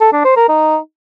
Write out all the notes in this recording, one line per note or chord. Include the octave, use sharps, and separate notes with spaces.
A4
D4
C5
A#4
D#4